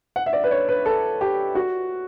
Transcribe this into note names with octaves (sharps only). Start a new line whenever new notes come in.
F#5
E5
D5
B4
C#5
B4
A4
G4
F#4